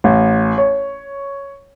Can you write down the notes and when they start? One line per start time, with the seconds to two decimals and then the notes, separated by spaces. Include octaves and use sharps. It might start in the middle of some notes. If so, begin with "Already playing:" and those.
0.04 A1
0.58 C#5